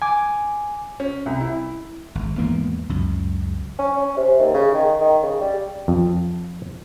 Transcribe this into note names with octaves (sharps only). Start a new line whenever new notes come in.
G#5 D6
C#4
C2
E4
G#1
E2 G#2 A#3 B3
C#2 F#2
C#4
C#4
C3
D#2
C#3
D#3
D#3
C#3
G3
F2